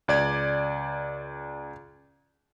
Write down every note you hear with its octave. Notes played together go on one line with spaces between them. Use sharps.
C#2 D5 G#6